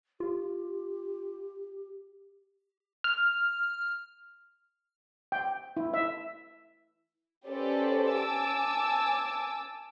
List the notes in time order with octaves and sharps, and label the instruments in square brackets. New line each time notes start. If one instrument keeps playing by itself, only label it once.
[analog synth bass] F4 [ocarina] G4
[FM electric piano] F6
[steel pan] G5
E4
E5
[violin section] C#4 G4 A4 B4 C5 D5
G#5 A5 D6 E6